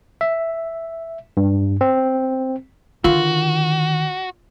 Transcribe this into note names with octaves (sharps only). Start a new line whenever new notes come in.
E5
G2
C4
D3 D#3 F4 F#4